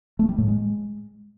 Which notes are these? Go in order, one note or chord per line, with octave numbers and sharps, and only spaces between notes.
A3
G3
A2
G#3